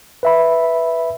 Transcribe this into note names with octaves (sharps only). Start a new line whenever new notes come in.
B4 E5 B5